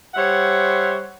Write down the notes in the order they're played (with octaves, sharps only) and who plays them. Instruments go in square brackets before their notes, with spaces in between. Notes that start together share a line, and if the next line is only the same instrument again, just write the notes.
[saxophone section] G3 C5 C#5 E5 F#5